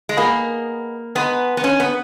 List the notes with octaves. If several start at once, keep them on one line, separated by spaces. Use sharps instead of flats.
G#3
A#3 B3 D#4 G#4 B4
G#3 B3 D#4 G#4 B4
B3
C#4
B3